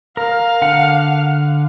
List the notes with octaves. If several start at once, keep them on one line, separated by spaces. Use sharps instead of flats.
A#4 F5
D3 F#5